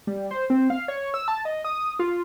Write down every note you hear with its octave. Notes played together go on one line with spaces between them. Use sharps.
G3
C5
C4
F5
C#5
E6
A5
D#5
D#6
F4